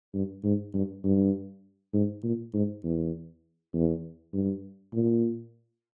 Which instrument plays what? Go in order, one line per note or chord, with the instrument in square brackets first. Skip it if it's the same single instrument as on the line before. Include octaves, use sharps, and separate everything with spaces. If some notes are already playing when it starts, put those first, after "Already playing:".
[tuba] G2
G#2
G2
G2
G#2
A#2
G#2
E2
E2
G2
A#2